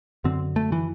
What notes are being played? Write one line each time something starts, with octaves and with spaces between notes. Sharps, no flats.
F#2 D3 C4
A3
E3